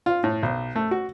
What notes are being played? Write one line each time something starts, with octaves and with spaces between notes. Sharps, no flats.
F4
A2
B1
A3
F#4